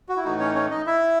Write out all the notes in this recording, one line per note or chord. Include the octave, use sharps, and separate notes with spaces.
F#4
E4
A2 E3 A3 D#4 F#4
C#4 C#5
C#4 C#5
D#4 D#5
E4 E5